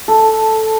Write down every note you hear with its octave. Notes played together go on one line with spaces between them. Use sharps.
A4